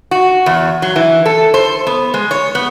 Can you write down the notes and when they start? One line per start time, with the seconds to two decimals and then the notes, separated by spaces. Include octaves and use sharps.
0.11 F#4
0.46 E2
0.82 F#3
0.96 E3
1.26 A4
1.54 C5
1.87 B3
2.14 G#3
2.31 C#5
2.55 B3